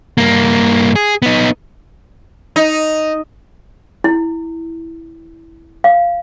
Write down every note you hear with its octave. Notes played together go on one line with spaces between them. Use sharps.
G2 A#3
G#4
B3 D#4
D#4
E4
F5